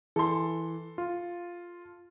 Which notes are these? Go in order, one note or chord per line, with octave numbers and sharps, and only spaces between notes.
E3 A4 C6
F4